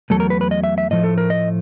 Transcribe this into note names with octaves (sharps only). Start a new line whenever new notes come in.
E2 B2 F#3 A3 A4
A#4
B4
B4
D#5
E5
E5
A2 F3 A3 D#5
A4
A#4
D#5